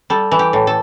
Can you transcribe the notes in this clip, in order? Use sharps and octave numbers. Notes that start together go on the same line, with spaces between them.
G3 A4
E3
G4
A2
A4